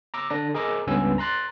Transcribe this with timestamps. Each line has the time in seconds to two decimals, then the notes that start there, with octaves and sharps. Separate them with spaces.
0.14 A#5 D6 E6
0.30 D3 D4 A#6
0.55 G#4 A#4 D#5 A#5 D6 E6
0.87 C#2 G2 B3 C#4 G#5 E6
1.18 A#5 C6 F#6 A6